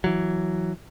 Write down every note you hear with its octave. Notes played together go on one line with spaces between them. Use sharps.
E3 F#3